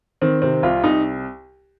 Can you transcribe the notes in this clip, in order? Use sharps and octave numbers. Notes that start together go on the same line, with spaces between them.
D#3 C4
C3 C4
C2 F4
C2 D#4